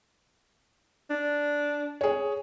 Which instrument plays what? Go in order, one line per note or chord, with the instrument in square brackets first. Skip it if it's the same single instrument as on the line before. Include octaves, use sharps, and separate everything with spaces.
[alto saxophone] D4
[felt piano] G#4 C#5